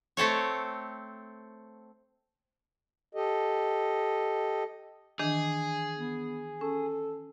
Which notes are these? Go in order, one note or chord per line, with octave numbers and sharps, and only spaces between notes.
A3 C4 A4 C#5
G4 A4 D#5
D#3 E3 D4 G#4
B3
C#4 A4